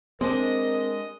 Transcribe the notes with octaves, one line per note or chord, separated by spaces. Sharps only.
G#3 C4 D4 A#4 D#5